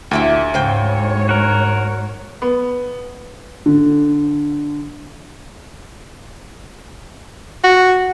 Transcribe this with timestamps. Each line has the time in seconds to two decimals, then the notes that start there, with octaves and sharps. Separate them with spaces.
0.11 D2 A#2 E4 G4 D7
0.54 G#2 C#3 C5 C#5 G5
1.29 F#4 A#4
2.42 B3
3.66 D3
7.64 F#4